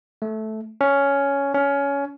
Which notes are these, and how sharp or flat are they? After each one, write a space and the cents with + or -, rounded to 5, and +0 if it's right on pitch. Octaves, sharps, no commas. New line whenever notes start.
A3 -10
C#4 +10
C#4 +20